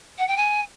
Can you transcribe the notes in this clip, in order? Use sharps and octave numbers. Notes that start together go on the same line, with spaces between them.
F#5
G5
G#5